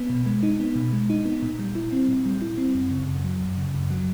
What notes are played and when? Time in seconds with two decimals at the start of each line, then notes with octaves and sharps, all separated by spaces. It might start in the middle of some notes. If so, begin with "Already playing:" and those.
Already playing: B3
0.10 B2
0.26 G#3
0.43 D#4
0.60 B3
0.76 B2
0.93 G#3
1.10 D#4
1.26 B3
1.42 A#2
1.59 G3
1.75 E4
1.92 C4
2.08 A#2
2.26 G3
2.42 E4
2.58 C4
2.75 F#2
2.91 C#3
3.08 F#2
3.24 F#3
3.41 F#2
3.57 C#3
3.74 F#2
3.90 F#3